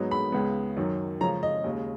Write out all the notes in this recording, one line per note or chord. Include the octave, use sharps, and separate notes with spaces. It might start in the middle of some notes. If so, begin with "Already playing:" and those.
Already playing: G#2 F#3 B3 D#4
B5
C#2 C#3 G#3 B3
F#2 D#3 F#3
C#3 F3 G#3 C#4 A#5
D#5
D#2 C#3 G#3